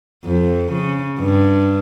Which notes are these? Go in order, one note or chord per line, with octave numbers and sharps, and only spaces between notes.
F2
C#3
G2